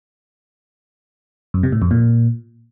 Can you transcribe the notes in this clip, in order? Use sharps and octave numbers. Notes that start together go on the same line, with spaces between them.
F#2
C3
A2
F2
A#2